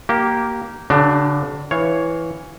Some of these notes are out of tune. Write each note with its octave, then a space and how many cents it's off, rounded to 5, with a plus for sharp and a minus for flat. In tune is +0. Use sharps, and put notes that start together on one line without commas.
A#3 +0 G4 -20
D3 -45 D4 +20 F#4 +40
E3 +0 C#5 +0 F5 +15